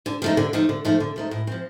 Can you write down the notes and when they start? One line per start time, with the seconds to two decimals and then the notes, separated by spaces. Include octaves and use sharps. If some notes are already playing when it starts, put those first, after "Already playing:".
0.06 D3
0.22 F3 A3 D#4
0.37 D3
0.53 F3 A3 D#4
0.69 D3
0.85 F3 A3 D#4
1.00 D3
1.16 F3 A3 D#4
1.31 A2
1.47 F3 C4